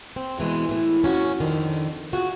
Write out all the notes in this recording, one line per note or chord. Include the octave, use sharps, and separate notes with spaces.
C4
E2 B2 E3 G#3
A2 E3
A#3 C#4 E4 F#4
F2 D3 D#3
F4 F#4 G#4 F#5